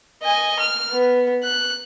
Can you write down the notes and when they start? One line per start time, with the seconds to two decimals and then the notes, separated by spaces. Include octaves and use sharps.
0.23 D#5 G#5
0.60 F6
0.93 B3
1.44 F#6